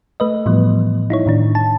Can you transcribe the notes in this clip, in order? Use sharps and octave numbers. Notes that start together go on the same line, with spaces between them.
A3 B4 D#5
A2 E3 F3 G3 B3
D#4 E4 C#5
A2 D#3 D4
A5